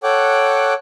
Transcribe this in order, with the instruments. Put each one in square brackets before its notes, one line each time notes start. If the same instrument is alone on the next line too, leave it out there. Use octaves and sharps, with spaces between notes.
[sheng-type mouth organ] A4 C#5 F#5 G5 D6 F#6